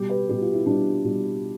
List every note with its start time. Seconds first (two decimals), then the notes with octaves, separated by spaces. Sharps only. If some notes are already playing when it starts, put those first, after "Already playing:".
Already playing: B2 G3 G4
0.09 B4
0.28 B2 G3 G4
0.41 F4
0.54 E4
0.66 B2 G3 D4
1.04 B2 G3